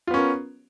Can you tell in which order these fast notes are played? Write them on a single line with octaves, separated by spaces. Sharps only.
F4 B3 C#4 A#4